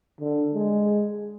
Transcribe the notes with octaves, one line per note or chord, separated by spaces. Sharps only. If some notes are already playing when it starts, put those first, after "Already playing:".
D3
G#3